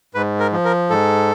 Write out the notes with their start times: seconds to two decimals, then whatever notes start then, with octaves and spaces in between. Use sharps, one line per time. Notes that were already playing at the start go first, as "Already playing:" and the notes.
0.15 G#2 B4
0.40 A#4
0.52 F3
0.65 A#4
0.90 G#2 A4